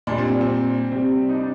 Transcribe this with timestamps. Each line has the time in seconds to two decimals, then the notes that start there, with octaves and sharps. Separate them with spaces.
0.07 A#2 G3 D4
0.18 C4
0.41 C4
0.92 C3 G3 C4
1.29 D#4
1.34 D4